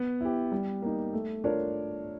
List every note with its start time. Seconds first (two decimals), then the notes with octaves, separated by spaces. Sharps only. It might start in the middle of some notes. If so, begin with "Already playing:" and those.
Already playing: B3
0.21 E4 G4
0.52 G3
0.82 A#3 D#4
1.13 A3
1.44 D4 F4 A#4 C#5